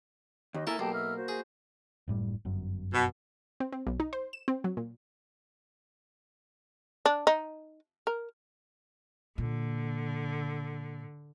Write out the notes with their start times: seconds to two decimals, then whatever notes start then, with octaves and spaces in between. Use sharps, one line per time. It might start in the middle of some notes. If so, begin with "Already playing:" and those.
0.54 D#2 D#5
0.67 A#3 E4 A4 A#4 G#5
0.79 B1 A#3 G4 G5 A5
0.94 E5 E6 F6
1.16 F#4 C5
1.28 G#4
2.08 F#1 A2 G3
2.45 G1 F#2
2.93 B2
3.60 C4
3.72 C4
3.87 B1
4.00 D#4
4.13 C5
4.33 E7
4.48 C4
4.64 F#3
4.77 A#2
7.06 D4
7.27 D#4
8.07 A#4
9.38 A#2 D3